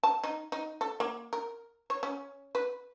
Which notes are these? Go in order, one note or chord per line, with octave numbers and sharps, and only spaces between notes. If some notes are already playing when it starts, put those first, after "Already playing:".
A5
D#4
D#4
A4
A#3
A#4
C#5
C#4
B4